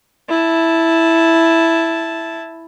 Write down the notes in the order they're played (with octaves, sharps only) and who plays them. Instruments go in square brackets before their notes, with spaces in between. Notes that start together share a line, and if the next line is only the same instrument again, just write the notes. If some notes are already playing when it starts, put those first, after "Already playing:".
[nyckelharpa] E4 A5